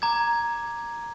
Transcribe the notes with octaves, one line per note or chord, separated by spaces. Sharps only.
A#5 D6 G#6